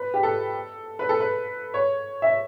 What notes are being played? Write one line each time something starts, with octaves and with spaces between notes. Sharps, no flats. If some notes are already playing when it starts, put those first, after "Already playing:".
Already playing: B4
G4
A4
B4
A4
B4
C#5
E5